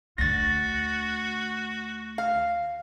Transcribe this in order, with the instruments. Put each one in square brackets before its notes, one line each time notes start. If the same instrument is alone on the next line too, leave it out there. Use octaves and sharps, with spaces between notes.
[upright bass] D2 D3 [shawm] F#4 [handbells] A6 A#6
[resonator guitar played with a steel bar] F5